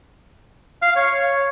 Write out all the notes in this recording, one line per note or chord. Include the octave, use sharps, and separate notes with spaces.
F5
C#5